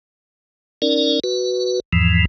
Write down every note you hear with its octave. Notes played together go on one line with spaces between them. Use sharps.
C#4 D#4 A#4 D5
F#4 B4
E2 G#2 E3 F3